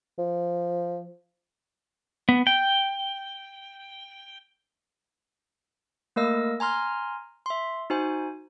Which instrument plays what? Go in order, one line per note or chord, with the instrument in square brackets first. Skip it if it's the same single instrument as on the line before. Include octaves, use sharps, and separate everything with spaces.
[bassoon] F3
[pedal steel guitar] B3
G5
[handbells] A3 A#3 A#4 D#5 E6
G#5 A#5 C6 F6
E5 C6
D#4 F#4 C5 G#5